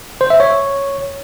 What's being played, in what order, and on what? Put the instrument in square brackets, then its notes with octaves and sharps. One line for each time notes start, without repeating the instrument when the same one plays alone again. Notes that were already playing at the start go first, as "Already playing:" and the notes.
[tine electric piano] C5
E5
C#5